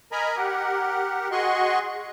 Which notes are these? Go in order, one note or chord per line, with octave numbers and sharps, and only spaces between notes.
A#4 D#5 G#5 A#5 B5
G4 A#4 F#5
F#4 G#4 D#5 C6 C#6